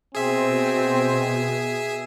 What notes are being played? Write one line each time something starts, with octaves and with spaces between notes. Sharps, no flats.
B2 C4 G#4 E5